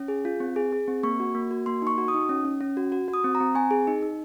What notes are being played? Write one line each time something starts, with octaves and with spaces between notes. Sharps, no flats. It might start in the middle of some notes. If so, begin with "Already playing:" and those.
Already playing: C#4
G#4
F4
C4
G#4
G#4
C4
A#3 C#6
F#4
A#3
F#4
A#3 C6
D#4 C#6
F#4
D#6
D#4
C#4
C#4
C#4
F#4
F#4
F#4
D#6
C4
A#5
C4
C4 G#5
G#4
D#4
D#4